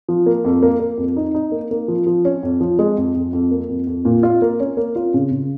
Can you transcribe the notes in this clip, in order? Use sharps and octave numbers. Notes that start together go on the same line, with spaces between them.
F3
A#3
F2
A#3
A#3
F2
D#4
D#4
A#3
A#3
F3
F3
C#4
F2
F3
G#3
F2
F2
F2
A#3
F2
F2
A#2
F4
A#3
C#4
A#3
F4
C#3
C#3